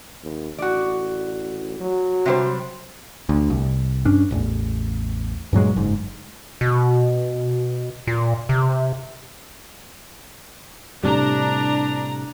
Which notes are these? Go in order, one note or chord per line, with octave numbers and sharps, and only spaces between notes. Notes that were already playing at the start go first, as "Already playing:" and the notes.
D#2
A1 F#4 D5
F#3
C3 G3 C5
D2
C2
G2 C#4 D4
D1 A1 E2
G2 A#2 F#3 G#3
F#1 G#2
B2
A#2
C3
A2 C3 G3 D4 A#5